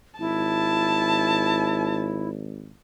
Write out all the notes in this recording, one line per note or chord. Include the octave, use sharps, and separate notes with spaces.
G#1 E4 A5